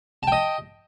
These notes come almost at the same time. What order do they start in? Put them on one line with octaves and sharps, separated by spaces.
A5 G5 D#5